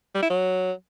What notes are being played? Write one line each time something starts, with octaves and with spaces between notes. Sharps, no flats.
G3
E4
F#3